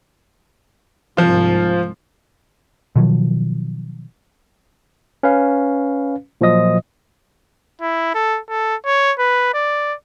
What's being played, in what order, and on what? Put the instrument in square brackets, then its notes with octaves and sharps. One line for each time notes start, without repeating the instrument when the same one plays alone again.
[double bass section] C2 G#2 [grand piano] F3 F4
[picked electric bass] B2 D#3 F3 F#3
[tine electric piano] C#4 B4 F5
A#2 F3 F#3 D#5 D#6
[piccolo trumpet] E4
A4
A4
C#5
B4
D5